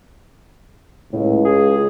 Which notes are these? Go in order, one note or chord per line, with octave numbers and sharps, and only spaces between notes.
C#2 A2
G#4